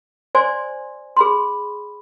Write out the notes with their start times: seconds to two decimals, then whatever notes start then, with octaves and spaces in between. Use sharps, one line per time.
0.35 C5 D5 G#5 C6
1.17 G#4 B5 C6